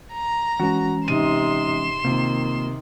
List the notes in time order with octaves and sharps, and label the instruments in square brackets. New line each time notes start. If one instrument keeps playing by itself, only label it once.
[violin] A#5
[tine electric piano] E3 G#3 C#4 [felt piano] F#4
[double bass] C3 D#4 [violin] C6 E7 [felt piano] D#7
[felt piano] C3 [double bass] D#3 [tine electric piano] A#3 F4